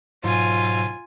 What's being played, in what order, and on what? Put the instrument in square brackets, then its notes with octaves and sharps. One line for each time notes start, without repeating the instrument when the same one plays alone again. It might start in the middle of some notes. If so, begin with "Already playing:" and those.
[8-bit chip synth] G#2 B2 F#3 [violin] F4 G#5